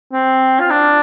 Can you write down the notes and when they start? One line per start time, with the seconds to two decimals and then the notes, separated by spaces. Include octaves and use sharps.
0.13 C4
0.60 F4
0.71 D4